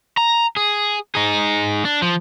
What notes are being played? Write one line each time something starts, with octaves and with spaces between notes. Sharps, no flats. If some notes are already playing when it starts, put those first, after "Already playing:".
A#5
G#4
D#4 G#4
D4
F3